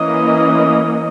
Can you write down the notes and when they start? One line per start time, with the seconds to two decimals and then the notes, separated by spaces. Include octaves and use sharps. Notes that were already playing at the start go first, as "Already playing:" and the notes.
Already playing: E3 A#3 C#4 D#5